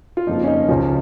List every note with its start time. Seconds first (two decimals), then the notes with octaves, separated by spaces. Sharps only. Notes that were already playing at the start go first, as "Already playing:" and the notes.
0.17 F4
0.27 F2 C#3 F3 A#3 D#4
0.43 C#4
0.48 A#3 D#4
0.68 C#2 C#3 F3 C#4 F4